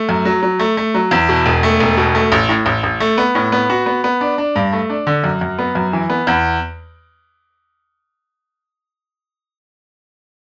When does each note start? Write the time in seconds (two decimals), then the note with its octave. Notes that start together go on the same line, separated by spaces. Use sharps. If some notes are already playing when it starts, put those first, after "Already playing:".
Already playing: A3
0.09 F#2
0.25 F#3
0.43 F#3
0.60 A3
0.77 A3
0.94 F#3
1.11 E2
1.29 B2
1.46 E1
1.63 A3
1.80 E1
1.97 B2
2.15 A3
2.32 A1
2.49 A2
2.66 A1
2.83 A1
3.00 A3
3.18 B3
3.35 A2
3.52 B3
3.70 F#4
3.86 B3
4.04 B3
4.21 D4
4.38 D4
4.56 G2
4.73 A3
4.89 D4
5.07 D3
5.24 F#2
5.41 F#2
5.59 B3
5.75 F#2
5.93 E3
6.10 B3
6.27 E2